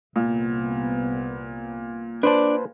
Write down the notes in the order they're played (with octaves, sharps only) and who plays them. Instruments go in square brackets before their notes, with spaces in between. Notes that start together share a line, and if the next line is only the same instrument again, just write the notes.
[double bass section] C2 B3 [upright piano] A#2
[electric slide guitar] D4 D5 [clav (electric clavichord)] B4 C5 A5